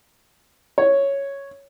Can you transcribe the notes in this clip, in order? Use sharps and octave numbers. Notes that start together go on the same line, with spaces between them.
C#5